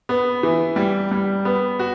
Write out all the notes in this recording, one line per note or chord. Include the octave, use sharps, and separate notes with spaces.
B3
E3
G3
G3
B3
F#4